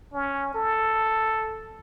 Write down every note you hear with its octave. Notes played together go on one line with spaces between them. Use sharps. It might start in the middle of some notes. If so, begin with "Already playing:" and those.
C#4
A4